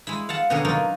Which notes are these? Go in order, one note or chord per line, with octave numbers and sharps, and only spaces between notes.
G#3 E4
F5 F#5 A5
B2 D3 C#4 F#4 G#4 A#4
F#3 D4 D#4 F4 A#4